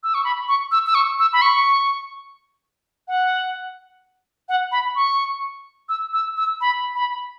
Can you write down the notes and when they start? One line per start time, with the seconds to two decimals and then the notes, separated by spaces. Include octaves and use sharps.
0.04 E6
0.14 C#6
0.24 B5
0.48 C#6
0.72 E6
0.86 E6
0.95 C#6
1.19 E6
1.33 B5
1.42 C#6
3.08 F#5
4.49 F#5
4.72 B5
4.96 C#6
5.89 E6
6.13 E6
6.37 E6
6.61 B5
6.95 B5